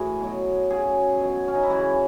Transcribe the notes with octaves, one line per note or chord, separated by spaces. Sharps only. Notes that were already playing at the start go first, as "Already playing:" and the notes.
Already playing: A2 E3 F#4 G#4
B2 F#3
C#3 F#3 G#4
B2 F#3
C#4
D#4
E4
C#3 E3 F#4